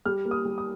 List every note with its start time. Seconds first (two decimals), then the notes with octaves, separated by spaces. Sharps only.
0.06 G3 F6
0.25 A#3
0.31 D#6
0.45 G3
0.58 D#6